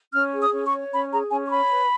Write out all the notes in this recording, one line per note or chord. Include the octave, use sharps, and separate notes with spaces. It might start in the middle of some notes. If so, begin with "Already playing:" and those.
C#4 F6
G#4
D#6
C#4
C#6
C#5
C#4 B5
G#4 A#5
C#4 G#5
C#6
C#5 B5
B4